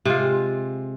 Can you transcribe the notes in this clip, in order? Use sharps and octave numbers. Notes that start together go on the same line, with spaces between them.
C3 G#3 F4